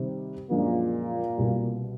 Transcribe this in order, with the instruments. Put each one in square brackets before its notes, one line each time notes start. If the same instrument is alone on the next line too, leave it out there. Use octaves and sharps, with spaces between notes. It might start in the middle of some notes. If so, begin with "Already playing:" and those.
Already playing: [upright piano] C3 D#3 G3 C4 D#4
[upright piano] F#2 D3 F3 G#3 [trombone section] A#2 A#3
[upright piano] C2 B2 G3